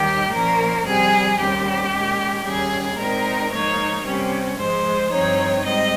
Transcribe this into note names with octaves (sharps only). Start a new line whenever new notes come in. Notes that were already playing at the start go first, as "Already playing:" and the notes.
Already playing: D#2 D#3 G3 G4
A#2 F3 A#3 C#4 A#4
F2 C3 G3 G#4
D#2 C#3 G3 C4 G4
A#2 G#3 C#4
D#2 C#3 G3 G#4
A#2 G#3 C4 D#4 A#4
G#2 F3 A#3 D#4 C#5
C3 G3 C#4
G#2 F3 G#3 C5
G2 F3 C4 D#4 C#5
G#2 G3 C4 D#5